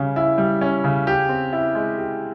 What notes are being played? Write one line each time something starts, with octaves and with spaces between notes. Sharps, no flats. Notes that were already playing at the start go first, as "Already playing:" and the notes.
Already playing: C#3 G3 C#4
E4
G3
C#4
C#3
G4
C4
E4
G#3
G4